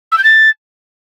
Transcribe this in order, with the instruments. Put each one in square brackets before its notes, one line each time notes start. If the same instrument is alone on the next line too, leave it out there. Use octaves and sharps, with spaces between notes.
[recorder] E6
G6
A6